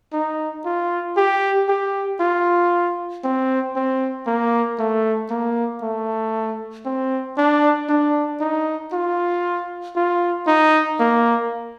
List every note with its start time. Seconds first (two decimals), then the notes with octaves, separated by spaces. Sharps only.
0.13 D#4
0.65 F4
1.17 G4
1.69 G4
2.20 F4
3.24 C4
3.76 C4
4.27 A#3
4.79 A3
5.30 A#3
5.82 A3
6.85 C4
7.38 D4
7.89 D4
8.41 D#4
8.93 F4
9.96 F4
10.47 D#4
11.00 A#3